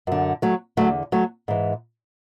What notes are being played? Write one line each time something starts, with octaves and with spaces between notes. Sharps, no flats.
F#2 D3
F#3 A3
E2 D3 F#3 A3
F#3 A3
G#2 E3